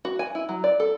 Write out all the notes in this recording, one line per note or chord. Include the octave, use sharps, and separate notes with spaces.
F#4
G#5
E4
F#3
D5
A4